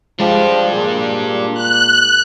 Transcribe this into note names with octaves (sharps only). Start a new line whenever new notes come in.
F3 G#3 D4 G4
A#2 G#4
F#6